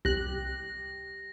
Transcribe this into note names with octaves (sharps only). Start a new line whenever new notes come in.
C2 G4 F#6 A#6